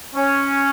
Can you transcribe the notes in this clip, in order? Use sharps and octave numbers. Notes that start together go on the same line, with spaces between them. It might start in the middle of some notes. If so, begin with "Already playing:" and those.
C#4